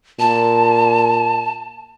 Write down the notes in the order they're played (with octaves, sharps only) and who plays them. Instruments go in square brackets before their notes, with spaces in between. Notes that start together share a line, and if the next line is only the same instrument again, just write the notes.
[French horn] A#2 [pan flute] A5